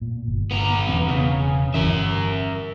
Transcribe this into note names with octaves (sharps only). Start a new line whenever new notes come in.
A#2
G1
B3 A#5
E1 E3 C4
C#3
G1 E3 A#4 E5